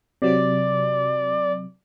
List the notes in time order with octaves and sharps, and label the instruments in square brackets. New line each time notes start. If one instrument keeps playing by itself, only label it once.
[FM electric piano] C3 F#3 [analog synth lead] D5